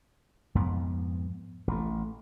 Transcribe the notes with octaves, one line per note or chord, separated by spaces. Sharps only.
F2 G#2 B3
A1 A3